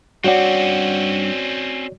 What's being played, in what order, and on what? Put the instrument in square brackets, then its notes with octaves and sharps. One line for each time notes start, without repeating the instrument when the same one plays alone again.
[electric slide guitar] G2 F#5 [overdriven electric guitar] C4 C#4 [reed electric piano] F#4 C#5 D5